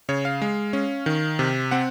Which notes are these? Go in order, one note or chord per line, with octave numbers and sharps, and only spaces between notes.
C#3 C#5
F5
G#3
C#4
D#3
C3
C4 F#5